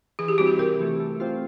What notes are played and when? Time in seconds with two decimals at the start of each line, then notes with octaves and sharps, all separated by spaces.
0.19 E3 G#4
0.28 G4
0.38 G3 C4 E4 F#4
0.47 G4
0.59 C3 A#4
0.80 E3 A3
1.00 A3
1.20 C4 F4